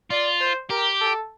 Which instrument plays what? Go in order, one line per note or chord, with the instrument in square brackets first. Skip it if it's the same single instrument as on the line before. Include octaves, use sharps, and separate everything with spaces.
[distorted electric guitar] F4 [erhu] D5
[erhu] C5
[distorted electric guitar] G4 [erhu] A#4
[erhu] A4